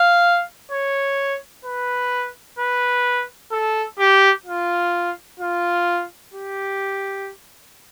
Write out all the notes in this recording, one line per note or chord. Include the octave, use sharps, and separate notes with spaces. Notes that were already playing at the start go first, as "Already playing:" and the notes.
Already playing: F5
C#5
B4
B4
A4
G4
F4
F4
G4